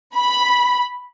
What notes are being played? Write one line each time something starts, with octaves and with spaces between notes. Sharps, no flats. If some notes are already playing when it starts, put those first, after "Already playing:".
B5